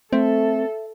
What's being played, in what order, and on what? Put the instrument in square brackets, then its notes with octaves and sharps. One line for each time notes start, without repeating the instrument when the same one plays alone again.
[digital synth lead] A3 [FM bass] C4 [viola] A4 [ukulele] E5